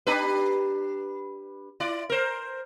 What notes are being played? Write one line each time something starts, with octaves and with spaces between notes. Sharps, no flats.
D4 G4 B4
E4 D5
A#4 C5